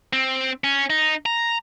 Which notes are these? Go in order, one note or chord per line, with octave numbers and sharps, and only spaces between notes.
C4
C#4
D#4
A#5